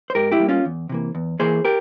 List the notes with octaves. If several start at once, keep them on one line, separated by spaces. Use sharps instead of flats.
C5
G#2 G4 A#4
E4 G4
G3 A#3
C#4 F4
E2
C3 E3 A#3
E2
E3 A#3 G#4 C5
G4 A#4